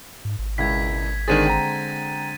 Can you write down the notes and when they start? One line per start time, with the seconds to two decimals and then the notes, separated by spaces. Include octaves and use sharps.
0.25 G#2
0.39 G#1
0.58 E1 C#2 E4 G#6 B6
1.28 D3 D#3 G#3 C4 D4 G#4 A6 D#7
1.47 G5 A#5